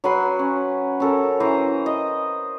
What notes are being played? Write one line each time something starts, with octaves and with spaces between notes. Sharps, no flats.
F#3 B4 B5 C6
C#4
C#4 A4 A#4
E3 C5 A#5
D#5